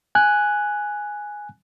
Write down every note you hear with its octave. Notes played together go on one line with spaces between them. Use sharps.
G#5 F#6